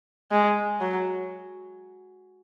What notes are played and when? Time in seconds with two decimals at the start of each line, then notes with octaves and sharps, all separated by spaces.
0.31 G#3
0.80 F#3